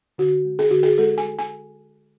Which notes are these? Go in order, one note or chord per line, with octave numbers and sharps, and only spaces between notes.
D3 F#4
G#3
G#4
D3 F#4
G#4
G#3 A4
G#5
G#3
G#5